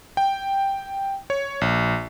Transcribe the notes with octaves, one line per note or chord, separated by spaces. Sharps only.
G5
C#5
A#1